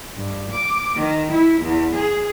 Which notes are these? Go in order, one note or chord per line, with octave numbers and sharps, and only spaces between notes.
G2
D6
D#3
E4
E2
G#4